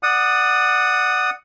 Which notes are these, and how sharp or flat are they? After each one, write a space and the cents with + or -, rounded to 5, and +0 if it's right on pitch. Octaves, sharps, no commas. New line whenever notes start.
D5 +20 F#5 +0 D#6 +0